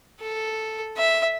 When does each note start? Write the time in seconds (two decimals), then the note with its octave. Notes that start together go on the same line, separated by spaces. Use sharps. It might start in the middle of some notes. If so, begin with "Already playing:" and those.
0.21 A4
0.97 E5